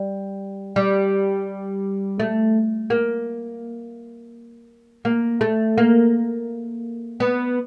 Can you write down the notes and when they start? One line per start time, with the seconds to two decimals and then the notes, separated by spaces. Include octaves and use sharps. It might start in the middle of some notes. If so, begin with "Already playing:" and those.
Already playing: G3
0.76 G3
2.20 A3
2.90 A#3
5.05 A#3
5.41 A3
5.78 A#3
7.20 B3